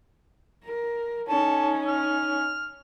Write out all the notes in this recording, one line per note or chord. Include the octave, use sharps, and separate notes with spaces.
A#4
C#4 D#4 A4
F6